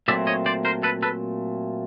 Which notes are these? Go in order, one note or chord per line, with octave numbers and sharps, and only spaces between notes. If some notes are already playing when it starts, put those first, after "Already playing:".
A#2 F#3 A3 C4 D5 E5
C#5 D#5
C5 D5
A#4 C5
A4 B4
A4 B4